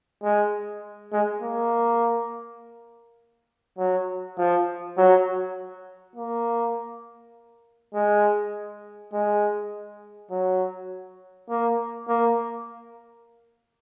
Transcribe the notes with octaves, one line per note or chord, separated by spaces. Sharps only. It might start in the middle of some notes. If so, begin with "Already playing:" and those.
G#3
G#3
A#3
F#3
F3
F#3
A#3
G#3
G#3
F#3
A#3
A#3